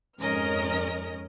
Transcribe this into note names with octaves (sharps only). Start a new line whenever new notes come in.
F2 G#2 C#4 A#4 D#5 F6